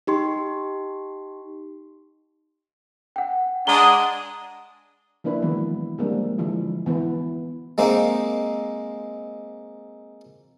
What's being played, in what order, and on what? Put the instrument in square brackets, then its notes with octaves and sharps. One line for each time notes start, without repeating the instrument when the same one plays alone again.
[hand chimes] D#4 G4 C6
[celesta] F#5 G5
[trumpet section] G#3 D4 D#6 [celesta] F#5 A#5 G7
[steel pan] F3 A#3 D4 E4 B4
D#3 E3 F#3 G#3 B3
F3 G3 G#3 A#3 C4 D4
D3 E3 F3 G#3 E4
E3 B3 E4 B4
[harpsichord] G#3 A#3 C4 D#4